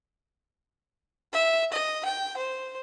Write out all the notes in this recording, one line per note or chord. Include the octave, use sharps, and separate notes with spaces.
E5
D#5
G5
C5